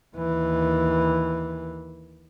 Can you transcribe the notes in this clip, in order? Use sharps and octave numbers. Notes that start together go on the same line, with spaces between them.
D#2 E3